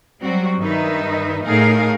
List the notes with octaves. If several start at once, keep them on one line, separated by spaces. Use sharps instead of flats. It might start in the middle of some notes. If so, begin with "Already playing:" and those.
F#3 G3 C4 F#4
G2 D#3 D#4 B4 E5
A2 A3 D#4 G#4 A#4 F5